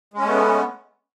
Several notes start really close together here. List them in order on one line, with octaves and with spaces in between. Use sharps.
G#3 C#4 A3 B3